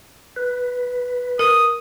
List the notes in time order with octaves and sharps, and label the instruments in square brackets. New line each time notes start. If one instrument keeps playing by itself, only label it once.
[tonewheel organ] B4
[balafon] A#4 [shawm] D#6